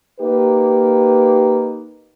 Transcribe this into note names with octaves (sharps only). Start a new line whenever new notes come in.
A#3 D#4 G4 B4